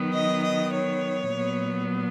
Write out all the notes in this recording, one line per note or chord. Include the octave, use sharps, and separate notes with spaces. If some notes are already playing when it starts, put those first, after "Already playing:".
Already playing: D#3 F#3 B3
D#5
D#5
C#5
A#2 F#3 B3